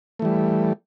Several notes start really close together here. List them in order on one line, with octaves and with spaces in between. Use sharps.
A3 E3 G3